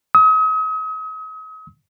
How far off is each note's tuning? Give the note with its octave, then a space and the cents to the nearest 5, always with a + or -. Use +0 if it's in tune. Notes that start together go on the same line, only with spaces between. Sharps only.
D#6 +40